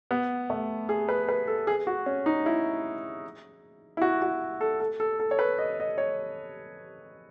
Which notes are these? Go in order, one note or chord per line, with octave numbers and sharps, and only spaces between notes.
B3
A3
G#4
B4
B4
A4
G#4
F#4
C#4
D#4
E4
E4
F#4
F#4
A4
A4
A4
A4
C#5
B4
D#5
D#5
C#5